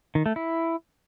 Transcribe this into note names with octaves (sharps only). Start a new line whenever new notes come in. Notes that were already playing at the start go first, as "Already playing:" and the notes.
D#3
A3
E4